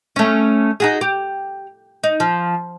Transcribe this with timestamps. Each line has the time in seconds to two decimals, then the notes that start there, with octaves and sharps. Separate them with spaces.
0.16 A3 C#4
0.80 D#4 F#4 G#4
1.01 G4
2.04 D#4
2.20 F3